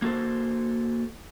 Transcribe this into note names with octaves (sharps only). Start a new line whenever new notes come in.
A#3 F#4 A4 C5